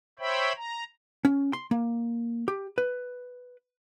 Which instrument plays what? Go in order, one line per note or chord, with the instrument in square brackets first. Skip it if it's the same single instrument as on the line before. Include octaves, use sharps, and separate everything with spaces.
[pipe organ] C5 C#5 E5 G5 B5
A#5
[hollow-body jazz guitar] C#4
C6
A#3
G4
B4